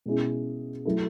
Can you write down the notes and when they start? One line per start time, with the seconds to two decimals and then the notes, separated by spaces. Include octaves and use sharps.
0.06 B2 G#3 C#4 E4 G#4
0.86 F#3 A3 E4 A4